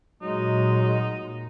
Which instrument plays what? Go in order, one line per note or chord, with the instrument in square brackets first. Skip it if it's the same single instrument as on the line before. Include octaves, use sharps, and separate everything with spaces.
[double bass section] A#2 [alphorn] F#3 [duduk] G#3 [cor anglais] D#4